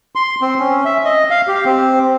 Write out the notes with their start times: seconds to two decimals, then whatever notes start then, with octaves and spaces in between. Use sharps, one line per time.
0.15 C6
0.41 C4
0.59 C#4
0.85 E5
1.05 D#5
1.30 F5
1.48 G4
1.65 C4